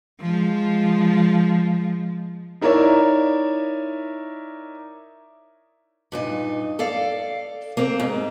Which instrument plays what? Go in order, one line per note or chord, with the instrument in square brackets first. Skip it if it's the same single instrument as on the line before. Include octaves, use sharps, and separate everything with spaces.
[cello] F3 G#3
[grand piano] D#4 E4 A#4 C#5 D5 E5
[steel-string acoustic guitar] G2 A#2 D#4
A4 D5 F5
A#3 C4
G#2